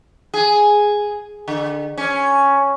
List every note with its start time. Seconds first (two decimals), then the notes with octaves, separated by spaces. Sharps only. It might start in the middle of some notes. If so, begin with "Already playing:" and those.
0.34 G#4
1.48 D3
1.98 C#4